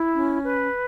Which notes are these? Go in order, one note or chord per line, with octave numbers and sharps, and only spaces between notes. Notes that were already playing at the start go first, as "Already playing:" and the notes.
Already playing: E4
C#4
B4